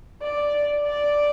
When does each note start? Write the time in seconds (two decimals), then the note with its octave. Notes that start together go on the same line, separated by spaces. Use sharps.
0.22 D5
0.87 D5